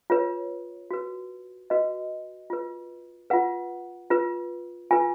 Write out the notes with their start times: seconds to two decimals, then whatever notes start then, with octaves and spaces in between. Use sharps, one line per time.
0.10 F4 B4 C#5
0.91 F#4 B4
1.70 F#4 B4 D#5
2.50 F4 B4
3.30 F4 B4 F#5
4.11 F4 B4
4.91 F4 B4 G#5